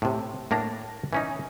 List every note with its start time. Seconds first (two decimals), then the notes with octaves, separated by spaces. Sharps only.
0.02 A2 C3
0.51 A2 A#3 D4 A#5
1.13 E3 C#4 D#4